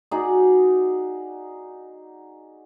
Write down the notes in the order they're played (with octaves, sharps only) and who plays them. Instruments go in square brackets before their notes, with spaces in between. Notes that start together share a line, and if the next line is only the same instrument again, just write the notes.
[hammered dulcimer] D#4 F#4 G#4 D5